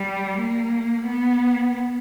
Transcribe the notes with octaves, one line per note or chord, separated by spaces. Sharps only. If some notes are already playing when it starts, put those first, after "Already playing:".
Already playing: G3
A#3
B3